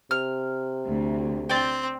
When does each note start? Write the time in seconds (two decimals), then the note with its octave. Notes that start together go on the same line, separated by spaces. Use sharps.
0.11 C3 F6
0.85 D2
1.49 C4 D5 G5